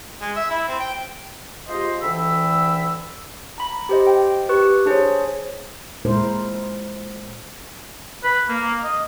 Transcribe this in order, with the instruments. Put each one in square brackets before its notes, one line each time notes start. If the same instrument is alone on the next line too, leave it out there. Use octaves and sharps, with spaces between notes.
[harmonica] G#3
E5
E4
C4
G5
[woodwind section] G#3 F4 G4 G#4 C5 D#5
D2 D3 E3 G5 B5 E6
[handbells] A#5 B5
G4 C5 D#5
G5
G4 B4 C#6
D4 G#4 C5 C#5
[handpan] A#2 G#3 E4 A#4 C5
[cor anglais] B4
A#3
D#5